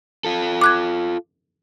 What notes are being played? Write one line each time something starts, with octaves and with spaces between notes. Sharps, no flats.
F4 A4
D6 F#6 G#6